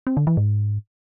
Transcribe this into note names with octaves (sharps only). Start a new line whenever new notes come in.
C4
D3
E3
G#2